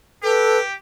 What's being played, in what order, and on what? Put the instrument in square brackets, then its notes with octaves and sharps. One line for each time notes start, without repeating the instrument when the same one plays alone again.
[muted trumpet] G4 [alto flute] A4 [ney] B4